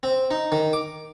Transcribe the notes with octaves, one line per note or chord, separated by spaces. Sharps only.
C4
D#4
D#3
D6